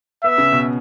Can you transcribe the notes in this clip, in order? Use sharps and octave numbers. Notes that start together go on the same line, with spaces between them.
B3 E5
C#3
B2